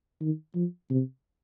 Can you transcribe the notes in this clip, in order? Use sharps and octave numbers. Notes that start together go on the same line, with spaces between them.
D#3
F3
C3